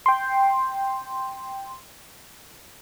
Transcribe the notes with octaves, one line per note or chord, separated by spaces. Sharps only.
G5 C6